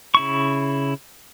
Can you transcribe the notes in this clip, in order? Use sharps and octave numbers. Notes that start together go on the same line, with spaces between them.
C#3 E4 C#6